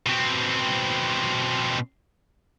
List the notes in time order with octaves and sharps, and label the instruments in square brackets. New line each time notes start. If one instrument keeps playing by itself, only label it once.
[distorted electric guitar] B2 C4